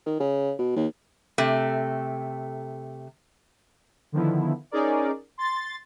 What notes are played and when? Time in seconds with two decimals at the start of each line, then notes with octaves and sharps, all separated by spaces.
0.06 D#3
0.20 C#3
0.59 B2
0.76 D#2
1.38 C3 A3
4.12 D3 D#3 F3 B3 E4
4.71 C#4 D#4 G#4 A#4 D5
5.38 C6 A6